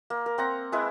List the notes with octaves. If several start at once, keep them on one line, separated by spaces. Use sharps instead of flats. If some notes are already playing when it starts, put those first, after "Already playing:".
A#3
A#4
C4 F#5 A#5
G#3 E4 B4